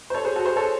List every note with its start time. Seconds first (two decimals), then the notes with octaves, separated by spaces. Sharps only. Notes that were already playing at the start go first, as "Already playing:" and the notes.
0.10 C5
0.14 A4 C#5
0.25 G#4 C5
0.36 F#4 A4
0.45 G#4 C5
0.56 A4 C#5